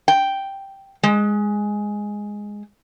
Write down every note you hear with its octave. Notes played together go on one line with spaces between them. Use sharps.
G5
G#3